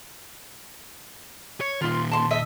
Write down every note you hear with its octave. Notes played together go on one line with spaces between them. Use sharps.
C#5
D#2 A#2 F4 C6
A5 C6
D#5 E5